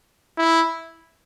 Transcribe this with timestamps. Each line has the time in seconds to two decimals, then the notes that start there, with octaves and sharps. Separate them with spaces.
0.37 E4